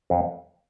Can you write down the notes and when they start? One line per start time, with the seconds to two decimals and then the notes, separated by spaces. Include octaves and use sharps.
0.10 F2